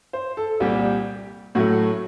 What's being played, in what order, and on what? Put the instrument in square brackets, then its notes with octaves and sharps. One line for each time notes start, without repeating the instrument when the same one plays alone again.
[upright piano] C5
A4
C2 A#2 G3 G4
A2 F#3 A3 F#4